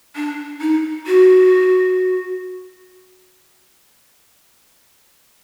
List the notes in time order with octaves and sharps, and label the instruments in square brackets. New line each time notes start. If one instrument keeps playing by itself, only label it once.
[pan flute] D4
D#4
F#4